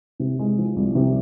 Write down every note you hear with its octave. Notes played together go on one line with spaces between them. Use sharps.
C3
G#3
F3
C2
C3